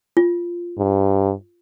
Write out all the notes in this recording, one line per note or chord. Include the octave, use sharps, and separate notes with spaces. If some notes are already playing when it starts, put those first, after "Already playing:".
F4
G2